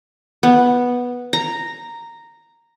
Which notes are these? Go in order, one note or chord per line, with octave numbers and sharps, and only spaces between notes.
B3
A#5